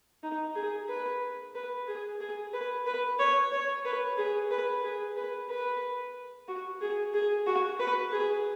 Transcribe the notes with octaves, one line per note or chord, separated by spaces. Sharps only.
D#4
G#4
B4
B4
G#4
G#4
B4
B4
C#5
C#5
B4
G#4
B4
G#4
B4
B4
F#4
G#4
G#4
F#4
B4
G#4